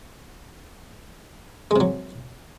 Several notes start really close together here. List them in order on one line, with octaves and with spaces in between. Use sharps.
G#3 C3 F#3